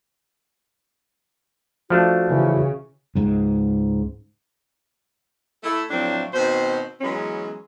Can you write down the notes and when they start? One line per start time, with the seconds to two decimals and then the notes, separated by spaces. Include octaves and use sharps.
1.90 F3 A3 D4 F#4
2.30 C#3 E3
3.16 C#2 G#2
5.64 A3 E4 A4
5.90 A2 F3 F#3 A3 C4 D4
6.34 B2 D#3 C4 C5
7.01 E3 F#3 G#3 B3 C#4